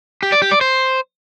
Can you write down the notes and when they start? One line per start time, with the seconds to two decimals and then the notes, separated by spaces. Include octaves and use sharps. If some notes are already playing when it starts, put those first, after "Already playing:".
0.23 G4
0.32 D5
0.42 G4
0.51 D5
0.61 C5